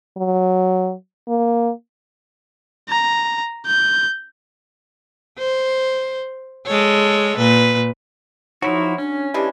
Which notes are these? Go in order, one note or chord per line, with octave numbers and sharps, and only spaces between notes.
F#3
A#3
A#5
G6
C5
G#3 A4 C#5
A#2 B4
F3 F#3 D#4 E4 F#4
C#4 D4
E3 G#3 D4 G4